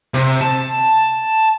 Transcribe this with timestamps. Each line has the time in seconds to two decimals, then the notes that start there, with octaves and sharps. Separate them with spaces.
0.14 C3
0.41 A5